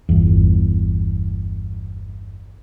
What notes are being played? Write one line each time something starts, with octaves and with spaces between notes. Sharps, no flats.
G1 E2